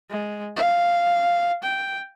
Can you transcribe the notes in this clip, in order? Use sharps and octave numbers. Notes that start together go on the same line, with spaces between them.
G#3
F5
G5